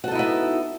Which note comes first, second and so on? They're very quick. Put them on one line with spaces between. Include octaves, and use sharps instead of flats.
F#4 A4 D#4 E4 B3